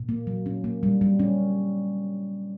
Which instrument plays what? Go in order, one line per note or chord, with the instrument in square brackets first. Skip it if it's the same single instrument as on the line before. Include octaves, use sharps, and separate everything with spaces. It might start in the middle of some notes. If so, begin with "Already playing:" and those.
Already playing: [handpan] A#2
A#3
F#3
C#4
A#3
G3
G3
C#4